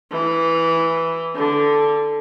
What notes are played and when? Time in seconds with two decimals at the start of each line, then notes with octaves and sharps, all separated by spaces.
0.12 E3
1.36 D3